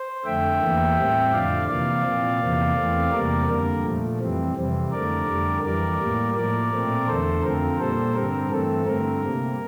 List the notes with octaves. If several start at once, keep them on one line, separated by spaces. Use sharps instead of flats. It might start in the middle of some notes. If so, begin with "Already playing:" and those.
Already playing: C5
F2 D3 A3 E5 G5
E2 E3 A#3
A2 G3 C4
F2 D3 F3 D5 F5
C3 E3 A#3 D5 F5
A#2 F3 C4
E2 C3 E3 A#3
E2 E3 A3 C4
E2 C3 G3 A#3 A#4 D5
F2 D3 G3 A#3 A#4
A#2 F3 A3
F2 E3 G3 C4
F2 C3 E3 G3 C4
F2 D3 A3 A#4 D5
F2 D3 G3
F2 E3 G3 A#4 D5
A2 G3 A#3
A2 F3 A#3 A#4 D5
A#2 A3 C4
E2 D3 A3 A4 C5
F2 D3 F3 C4 A#4
A#2 G3 A#3 A4 C5
G2 D3 G3 C4 A#4
G2 E3 A3 C4 A4
G2 D3 A3 C4 A#4
C3 G3 A#3